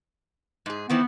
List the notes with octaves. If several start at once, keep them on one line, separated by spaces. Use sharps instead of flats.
G#2 G#4
D#3 E3 B3 C4